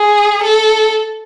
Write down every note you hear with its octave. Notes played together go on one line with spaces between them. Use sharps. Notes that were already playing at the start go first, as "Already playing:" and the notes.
Already playing: G#4
A4